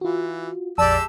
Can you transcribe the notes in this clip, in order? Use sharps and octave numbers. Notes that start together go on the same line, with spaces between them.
E3 F4 F#4
A#1 F2 G#3 G4 D5 A5 E6